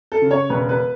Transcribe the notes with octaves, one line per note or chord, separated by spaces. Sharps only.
A4
C#3
C#5
E1 B4
B4